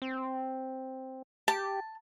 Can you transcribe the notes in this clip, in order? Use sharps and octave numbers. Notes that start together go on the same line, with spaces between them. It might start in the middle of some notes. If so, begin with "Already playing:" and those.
C4
G4 A5